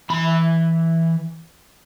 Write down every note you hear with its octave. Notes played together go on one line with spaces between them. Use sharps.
E3 B5